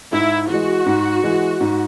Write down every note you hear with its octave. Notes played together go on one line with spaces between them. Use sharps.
G#2 E4
E3 G#3 F#4
G#2
E3 G#3
G#2